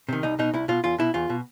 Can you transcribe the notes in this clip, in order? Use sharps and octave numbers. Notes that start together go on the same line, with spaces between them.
C3 D#3
C2 D#4
B2 D#4
C2 E4
B2 F4
E2 F4
B2 E4
E2 F4
B2